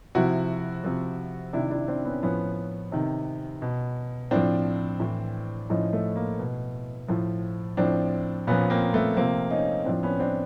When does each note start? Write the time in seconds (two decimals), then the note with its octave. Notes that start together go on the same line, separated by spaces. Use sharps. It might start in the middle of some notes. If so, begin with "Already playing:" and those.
0.15 C3 F3 E4 F#4
0.84 C3 F3
1.53 C3 D#3 D4 E4
1.70 D4 E4
1.88 C4 D4
2.05 B3 C#4
2.23 A2 F3 B3 C#4
2.92 C3 D#3
3.62 B2
4.31 A2 F3 C4 D4
5.00 A2 E3
5.70 A2 F3 C#4 D#4
5.93 A3
6.16 A#3
6.39 B2
7.08 A2 F3
7.77 A2 F3 C4 D4
8.47 A#2 F3 B3 C#4
8.70 A#3 C4
8.93 A3 B3
9.17 C3 F3 A#3 C4
9.50 C#4 D#4
9.85 A2 F3 C4 D4
10.03 B3 C#4
10.20 C4 D4